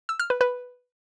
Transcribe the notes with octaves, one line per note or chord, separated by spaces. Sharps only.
E6
F6
B4
B4